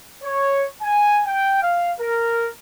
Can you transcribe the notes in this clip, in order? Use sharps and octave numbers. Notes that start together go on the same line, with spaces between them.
C#5
G#5
G5
F5
A#4